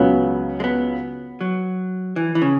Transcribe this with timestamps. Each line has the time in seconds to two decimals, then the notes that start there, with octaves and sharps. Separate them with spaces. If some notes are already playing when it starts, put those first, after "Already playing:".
Already playing: C#2 C#3 F#3 B3
0.60 G#3
0.64 B3
1.41 F#3
2.16 E3
2.35 E3
2.42 C#3